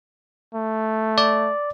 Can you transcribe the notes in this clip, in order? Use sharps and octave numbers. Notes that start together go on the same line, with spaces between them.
A3
D5